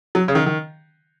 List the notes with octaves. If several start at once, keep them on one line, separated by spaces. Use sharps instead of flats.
F#3
C#3
D#3
D#3